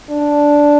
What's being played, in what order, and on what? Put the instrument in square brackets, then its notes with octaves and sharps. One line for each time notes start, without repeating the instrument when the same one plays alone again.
[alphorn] D4